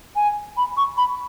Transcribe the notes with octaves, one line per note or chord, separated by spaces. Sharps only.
G#5
B5
C#6
B5